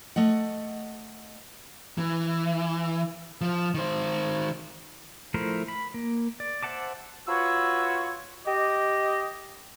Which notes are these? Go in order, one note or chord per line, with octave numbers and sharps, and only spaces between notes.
A3 D#5 F#5
E3
F3
D#3 C5
F3 A3 E4 A#4 C5
B5
A#3
D5
C5 E5 F#5 A5 D6
F4 F#4 B4 C#5 E6
G4 D#5